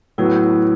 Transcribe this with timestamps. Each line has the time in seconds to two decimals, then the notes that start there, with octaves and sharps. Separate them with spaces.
0.18 A2 F#3 B3 E4